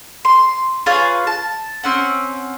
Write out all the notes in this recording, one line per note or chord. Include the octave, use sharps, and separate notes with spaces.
C6
F4 G#4 B4 C#5
A5
C4 C#4 F#5